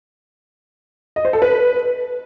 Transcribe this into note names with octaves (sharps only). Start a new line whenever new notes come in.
D#5
C5
A4
B4